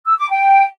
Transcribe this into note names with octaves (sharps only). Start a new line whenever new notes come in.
E6
D6
G5